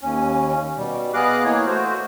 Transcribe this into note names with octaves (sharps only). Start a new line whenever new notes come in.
D#2 C#4
B2 G3
B3 G#4 D#5 F5 D6 F#6
E3 A#3 C#5
A3 F#4 C5